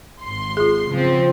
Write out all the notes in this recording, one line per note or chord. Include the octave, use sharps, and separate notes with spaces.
G#1 C6
F4 G#4
C#3 F3 C4